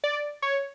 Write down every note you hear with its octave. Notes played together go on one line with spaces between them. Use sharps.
D5
C#5